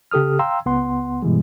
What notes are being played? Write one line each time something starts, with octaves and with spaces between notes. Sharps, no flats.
C#3 G4 A4 D#6 F6
F5 G5 A#5 C6 E6
C#2 B3 F#5 C6
G2 B2 E3 G3 G#3